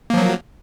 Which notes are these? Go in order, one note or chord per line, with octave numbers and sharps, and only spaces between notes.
F3 F#3 A#3